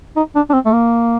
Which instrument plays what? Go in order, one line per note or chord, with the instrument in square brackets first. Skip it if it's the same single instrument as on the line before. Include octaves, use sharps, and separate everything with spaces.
[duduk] D#4
D4
D4
C4
A3
A#3